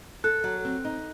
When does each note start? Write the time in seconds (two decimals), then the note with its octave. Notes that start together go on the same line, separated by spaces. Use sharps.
0.24 A4 F#6
0.44 F#3
0.65 C4
0.85 D#4